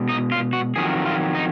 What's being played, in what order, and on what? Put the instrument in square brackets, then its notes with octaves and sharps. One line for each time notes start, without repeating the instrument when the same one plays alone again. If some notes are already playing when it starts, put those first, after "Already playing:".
Already playing: [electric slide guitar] B2 G#3
D#4
F4
F#4
F2 D#3 F#3 G#4
F4
D#4